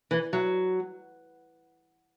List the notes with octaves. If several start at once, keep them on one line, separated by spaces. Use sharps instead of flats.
E3
F#3